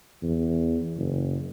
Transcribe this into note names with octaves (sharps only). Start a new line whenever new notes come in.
E2
F#1